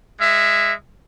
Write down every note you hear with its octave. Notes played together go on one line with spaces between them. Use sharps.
G#3 E5